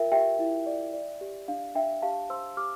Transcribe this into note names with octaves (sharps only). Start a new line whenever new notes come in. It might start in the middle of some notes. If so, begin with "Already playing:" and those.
Already playing: F4 A#4 E5 G5
G4 E5 G5
E4
D5
D5
G4
D4 F5
D4 E5 G5
G4 F5 A5
C5 C6 E6
G4 D6 F6